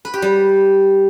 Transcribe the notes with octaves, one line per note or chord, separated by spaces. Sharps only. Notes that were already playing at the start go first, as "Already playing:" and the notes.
B4
G4
G3